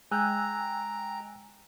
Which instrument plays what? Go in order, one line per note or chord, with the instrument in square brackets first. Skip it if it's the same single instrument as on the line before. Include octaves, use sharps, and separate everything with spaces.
[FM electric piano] G#3 G5 [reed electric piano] G#5 E6 F#6 [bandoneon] A#5